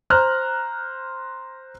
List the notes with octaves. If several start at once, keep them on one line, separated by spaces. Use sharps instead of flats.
C5 A#5 F6 F#6